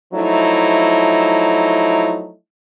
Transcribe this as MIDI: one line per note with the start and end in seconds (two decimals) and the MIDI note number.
0.13 2.34 53
0.13 2.34 54
0.13 2.34 57
0.13 2.34 63
0.13 2.34 64